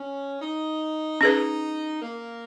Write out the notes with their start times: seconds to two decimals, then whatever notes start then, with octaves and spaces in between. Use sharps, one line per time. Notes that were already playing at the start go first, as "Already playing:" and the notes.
Already playing: C#4
0.41 D#4
1.21 C#4 D#4 G#4 B4
2.02 A#3